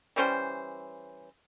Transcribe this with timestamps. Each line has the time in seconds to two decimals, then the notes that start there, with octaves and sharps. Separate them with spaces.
0.16 E3 G3 C#4 C5